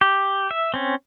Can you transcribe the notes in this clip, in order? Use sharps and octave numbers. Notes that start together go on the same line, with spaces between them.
G4
E5
C4 C#4